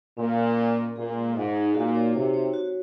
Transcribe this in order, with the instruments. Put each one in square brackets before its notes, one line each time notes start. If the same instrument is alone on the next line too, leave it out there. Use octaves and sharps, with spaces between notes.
[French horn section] A#2 [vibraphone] C#4
[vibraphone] F4
C#4
D#5
[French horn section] A#2 [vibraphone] G#4
[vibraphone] G#3
[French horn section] G#2 [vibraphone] D#4
[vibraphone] D#4
[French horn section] A#2 [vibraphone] F#4
[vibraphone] C#5
[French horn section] C3 [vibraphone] C#5
[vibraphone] C#5
F#4